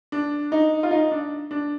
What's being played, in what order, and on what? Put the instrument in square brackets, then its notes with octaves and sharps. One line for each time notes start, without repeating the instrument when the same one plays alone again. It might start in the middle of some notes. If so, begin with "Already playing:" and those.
[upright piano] D4
D#4
F4
D#4
D4
D4